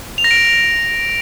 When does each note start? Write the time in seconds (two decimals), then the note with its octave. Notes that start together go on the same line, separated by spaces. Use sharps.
0.18 F7
0.24 A#6
0.31 D7
0.37 F7